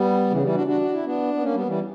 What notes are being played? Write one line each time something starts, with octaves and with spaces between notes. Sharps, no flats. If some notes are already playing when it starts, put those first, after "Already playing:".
Already playing: G3 B3
C#3 E3
E3 G3
D4 F#4
D4 F#4
F#4
E4
B3 D4
B3
A#3 C#4
G3 B3
E3 G3